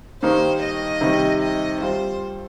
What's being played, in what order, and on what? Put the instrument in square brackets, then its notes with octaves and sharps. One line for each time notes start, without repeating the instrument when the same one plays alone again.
[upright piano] G2 D#3 G3 A#3 D#4 [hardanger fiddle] C5
[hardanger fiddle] D#5
[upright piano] C3 D#3 G3
[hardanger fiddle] D#5
[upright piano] G2 G3 C4 F4 [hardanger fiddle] C5